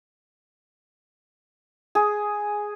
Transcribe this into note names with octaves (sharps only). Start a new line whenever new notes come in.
G#4